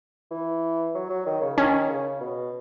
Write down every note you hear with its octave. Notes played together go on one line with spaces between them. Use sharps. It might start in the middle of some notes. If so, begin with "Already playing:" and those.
E3
F#3
F#3
D#3
C#3
D#3 C#4
C#3
B2